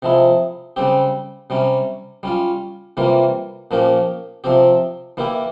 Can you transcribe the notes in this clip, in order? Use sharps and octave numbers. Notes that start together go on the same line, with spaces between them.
C3 F3 G#3 E4
C#3 G3 C4 G4
C3 G3 C#4
G3 C#4 F4
C3 E3 G3 A#3 F4
A#2 F3 A#3 C#4 G4
C3 F3 C4 G4
E3 A#3 E4 G4